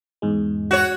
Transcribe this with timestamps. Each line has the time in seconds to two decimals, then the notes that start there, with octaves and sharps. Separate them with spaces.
0.22 E2 G#2 G#3
0.71 F#4 C#5